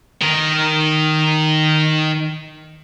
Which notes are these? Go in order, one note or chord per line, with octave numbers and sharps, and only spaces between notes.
D#3 A#4